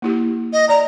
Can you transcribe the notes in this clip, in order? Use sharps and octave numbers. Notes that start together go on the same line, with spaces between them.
A#3 E4 G4
D#5
D5 A#5